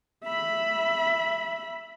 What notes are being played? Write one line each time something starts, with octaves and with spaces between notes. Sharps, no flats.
E5 B5